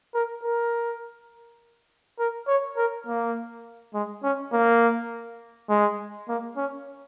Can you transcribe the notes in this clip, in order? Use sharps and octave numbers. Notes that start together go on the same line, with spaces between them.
A#4
A#4
A#4
C#5
A#4
A#3
G#3
C#4
A#3
G#3
A#3
C#4